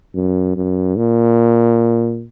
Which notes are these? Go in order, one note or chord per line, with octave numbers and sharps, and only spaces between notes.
F#2
F#2
A#2